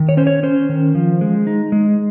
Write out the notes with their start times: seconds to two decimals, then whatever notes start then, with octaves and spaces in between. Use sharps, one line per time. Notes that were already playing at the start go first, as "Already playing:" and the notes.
Already playing: D#3
0.09 C#5
0.17 C#4 C5
0.27 C#5
0.43 C#4 C5
0.69 D#3
0.95 F3
1.21 G#3
1.47 D#4
1.72 G#3